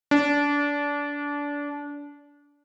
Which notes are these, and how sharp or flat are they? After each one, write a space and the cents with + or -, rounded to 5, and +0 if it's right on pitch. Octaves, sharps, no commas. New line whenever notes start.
D4 -25